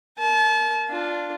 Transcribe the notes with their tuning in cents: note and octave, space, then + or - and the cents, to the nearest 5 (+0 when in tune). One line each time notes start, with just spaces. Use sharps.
A#4 +0 A5 -35
D4 +0 F4 -5